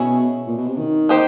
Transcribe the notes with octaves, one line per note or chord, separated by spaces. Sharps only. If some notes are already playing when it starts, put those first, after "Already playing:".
Already playing: B2 C#4 E4 G#4 C#5
A#2
B2
C3
D#3
A#3 D#4 G4 C5